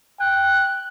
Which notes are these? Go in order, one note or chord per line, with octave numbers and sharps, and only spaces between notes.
G5 F#6